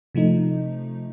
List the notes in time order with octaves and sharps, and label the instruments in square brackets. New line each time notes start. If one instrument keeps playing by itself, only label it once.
[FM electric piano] C3 F3 A3 D#4